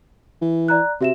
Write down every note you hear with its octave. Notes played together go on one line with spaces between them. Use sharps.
E3
D5 A#5 F#6
C3 F#4 E5 E7